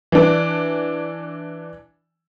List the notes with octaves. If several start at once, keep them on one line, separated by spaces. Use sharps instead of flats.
E3 D4